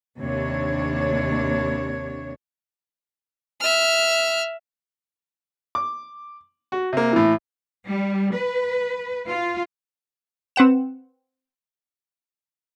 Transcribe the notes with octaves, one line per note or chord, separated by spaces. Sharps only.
D#2 C3 D4 C#5
E5 F6
D6
F#4
C3 A#3
A2 E3
G3
B4
F4
C4 B4 F#5 E7